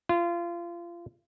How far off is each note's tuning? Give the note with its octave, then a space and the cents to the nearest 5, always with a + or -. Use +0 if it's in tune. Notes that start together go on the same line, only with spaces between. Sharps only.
F4 -25